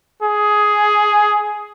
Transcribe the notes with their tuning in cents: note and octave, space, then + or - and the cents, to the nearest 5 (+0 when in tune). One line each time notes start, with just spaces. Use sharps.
G#4 +10